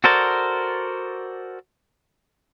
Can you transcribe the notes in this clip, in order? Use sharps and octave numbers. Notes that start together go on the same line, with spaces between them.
F#4 A4 A#4 C5 D5